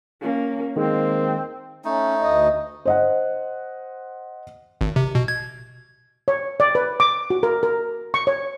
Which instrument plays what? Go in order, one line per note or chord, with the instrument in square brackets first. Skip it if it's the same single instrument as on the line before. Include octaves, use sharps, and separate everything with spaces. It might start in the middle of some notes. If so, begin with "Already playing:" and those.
[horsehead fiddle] A#3 C#4
[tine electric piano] D#3 G#3 [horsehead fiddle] A#3 [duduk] C4
[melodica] A3 D#4 [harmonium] C#4
[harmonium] D2 D#5
[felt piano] C5 D#5 F#5
[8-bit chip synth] G#1
C3
B2
G#6
[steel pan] C#5
D5
B4
D6
F#4
A#4
A#4
C#6
C#5